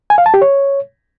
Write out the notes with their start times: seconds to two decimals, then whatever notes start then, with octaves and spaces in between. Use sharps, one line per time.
0.10 G#5
0.18 F5
0.26 A5
0.34 G4
0.42 C#5